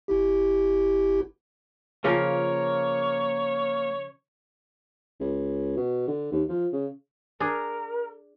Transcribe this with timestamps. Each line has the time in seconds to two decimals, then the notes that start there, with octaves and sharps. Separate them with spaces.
0.08 G1 E4 G4
2.04 C#3 F3 A#3 A#4 C#5
5.20 C#2
5.77 B2
6.08 D3
6.32 D#2
6.49 F3
6.73 C#3
7.40 D4 G#4 A#4